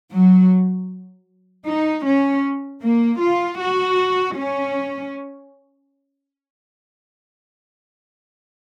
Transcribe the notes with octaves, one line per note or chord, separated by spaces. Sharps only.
F#3
D#4
C#4
A#3
F4
F#4
C#4